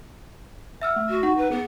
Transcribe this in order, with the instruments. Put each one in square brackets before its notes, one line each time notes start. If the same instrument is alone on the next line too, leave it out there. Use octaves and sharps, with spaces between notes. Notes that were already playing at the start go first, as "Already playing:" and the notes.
[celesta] E5 E6 F6 [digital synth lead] F#5
[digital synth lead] A3
[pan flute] F#4
[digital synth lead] D#4 [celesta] F#5
[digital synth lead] D#4 [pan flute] B4
[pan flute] B3 [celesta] G#4